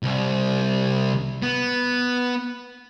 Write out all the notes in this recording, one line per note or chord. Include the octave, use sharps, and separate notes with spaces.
C2
B3